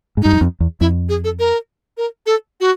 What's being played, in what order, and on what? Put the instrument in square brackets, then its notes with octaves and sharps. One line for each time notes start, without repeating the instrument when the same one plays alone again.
[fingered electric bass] G#2
[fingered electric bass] G2 [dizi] D#4
[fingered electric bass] F#2
F2
E2
[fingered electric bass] F2 [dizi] E4
[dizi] G#4
A4
A#4
A#4
A4
F#4